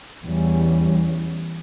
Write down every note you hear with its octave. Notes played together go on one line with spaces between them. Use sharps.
E2 E3 G3 C#4